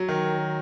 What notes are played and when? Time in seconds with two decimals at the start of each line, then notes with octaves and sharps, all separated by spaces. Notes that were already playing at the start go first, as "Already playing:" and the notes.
Already playing: F#3
0.08 D#3